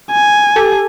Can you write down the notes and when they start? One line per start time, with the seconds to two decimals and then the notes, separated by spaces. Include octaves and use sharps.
0.11 G#5
0.56 G4 A4